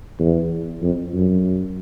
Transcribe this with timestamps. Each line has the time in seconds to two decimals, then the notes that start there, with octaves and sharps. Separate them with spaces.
0.19 E2
0.82 F2
1.14 F#2